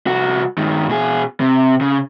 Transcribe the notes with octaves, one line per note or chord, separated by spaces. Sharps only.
C2 F#4
G2 D#3
B2 G#4
C3
C#3